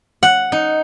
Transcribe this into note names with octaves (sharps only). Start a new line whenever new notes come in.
F#5
D#4